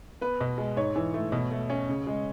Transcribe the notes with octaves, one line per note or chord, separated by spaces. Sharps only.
B3 B4
B2
G#3
G#2 C#5
E3
A3
B2
A3
C#4
C#3
G#3